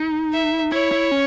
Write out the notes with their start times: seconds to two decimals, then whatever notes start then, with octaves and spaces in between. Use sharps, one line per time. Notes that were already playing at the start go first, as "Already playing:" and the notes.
Already playing: D#4
0.33 E5
0.72 E4 C#5
0.92 E4
1.11 C#4